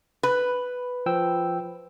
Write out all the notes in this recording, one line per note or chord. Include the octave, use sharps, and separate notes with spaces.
B4
F3 G5 E6